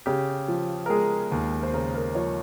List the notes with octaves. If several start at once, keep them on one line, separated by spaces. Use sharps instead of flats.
C#3 G4
F3
A#4
G#3 G#4
D#2
C5
C#3 A#4
A#4
F3 C#5